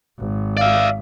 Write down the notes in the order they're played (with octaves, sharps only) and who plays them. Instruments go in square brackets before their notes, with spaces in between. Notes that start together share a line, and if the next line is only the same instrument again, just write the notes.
[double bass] G#1
[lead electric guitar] D5 E5 [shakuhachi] F5